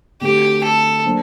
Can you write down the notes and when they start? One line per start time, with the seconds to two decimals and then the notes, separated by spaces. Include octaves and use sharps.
0.21 D3 A3 C4 F#4 G4 A4
0.64 A4
1.05 F#3 A#3 D4 A4 C5